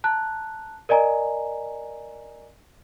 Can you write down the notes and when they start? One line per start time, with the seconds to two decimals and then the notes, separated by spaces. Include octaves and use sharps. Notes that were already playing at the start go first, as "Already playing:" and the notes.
0.04 A5 A#5 F#6
0.89 A#4 D5 D#5 G#5 A#5